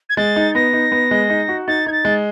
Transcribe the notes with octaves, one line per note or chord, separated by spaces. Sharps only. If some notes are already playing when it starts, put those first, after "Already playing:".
G#6
G#3 A6
D#4
B3 A#6
D#4
B3
G#3
D#4
F#4
D#4 A6
D#4 G#6
A6
G#3